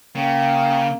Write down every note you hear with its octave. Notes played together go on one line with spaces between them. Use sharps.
C#3 A#3 G5